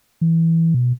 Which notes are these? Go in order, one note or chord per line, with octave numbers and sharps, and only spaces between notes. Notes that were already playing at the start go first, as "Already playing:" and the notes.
E3
B2